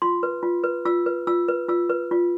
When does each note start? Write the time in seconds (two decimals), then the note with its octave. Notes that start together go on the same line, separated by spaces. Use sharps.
0.02 F4 C6
0.23 B4
0.43 F4
0.64 B4
0.85 F4 E6
1.06 B4
1.27 F4 E6
1.48 B4
1.68 F4 E6
1.90 B4
2.11 F4